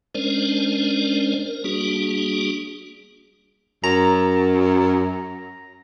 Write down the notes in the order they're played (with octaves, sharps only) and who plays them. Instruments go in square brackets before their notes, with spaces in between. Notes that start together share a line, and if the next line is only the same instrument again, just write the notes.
[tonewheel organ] G#3 C#4 D4 A#4 C5 D5
A#4
G3 A#3 D4 F#4 G#4
[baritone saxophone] F#2 [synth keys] A#5